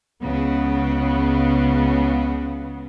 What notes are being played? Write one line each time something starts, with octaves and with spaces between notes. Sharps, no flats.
C#2 C#3 B3